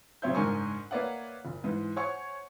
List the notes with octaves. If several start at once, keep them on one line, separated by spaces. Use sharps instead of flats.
C#3 F#3 C4 C#5 E5 G6
F#1 G#2 D4 A#4 G#5 C#6
A#3 B4 C#5 D5 E5 F#5
F#1
G#2 E3
C5 C#5 F#5 G#5 C#6